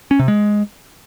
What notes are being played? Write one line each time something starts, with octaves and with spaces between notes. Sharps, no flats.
C#4
C3
G#3